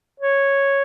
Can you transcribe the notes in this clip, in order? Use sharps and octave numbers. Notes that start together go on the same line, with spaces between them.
C#5